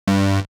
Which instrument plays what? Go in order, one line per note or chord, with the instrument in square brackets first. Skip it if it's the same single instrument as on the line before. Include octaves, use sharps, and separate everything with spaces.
[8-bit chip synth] G2